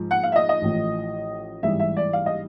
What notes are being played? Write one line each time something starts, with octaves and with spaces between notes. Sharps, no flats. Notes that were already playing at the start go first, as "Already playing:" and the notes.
Already playing: G#2 F3
F#5
F5
E5
D#5
D#5
A1 A2 F3
A1 G#2 E3 G3 E5
E5
D5
F5
D#5